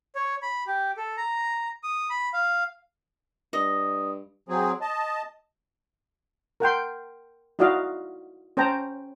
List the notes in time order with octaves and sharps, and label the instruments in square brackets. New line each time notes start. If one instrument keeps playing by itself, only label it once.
[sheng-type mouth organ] C#5
B5
G4
A4
A#5
D#6
B5
F5
[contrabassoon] G2 [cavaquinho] D#5
[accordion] F#3 C4 G#4
D#5 A5
[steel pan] A#4 F#5 G5 C6
D#4 E4 F#4 D5 D#5 F5
C#4 C5 G5 A5 A#5